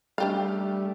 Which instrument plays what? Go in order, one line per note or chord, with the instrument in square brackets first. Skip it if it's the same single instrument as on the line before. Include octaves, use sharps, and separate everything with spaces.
[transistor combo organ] G3 A3 [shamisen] D4 G4 F5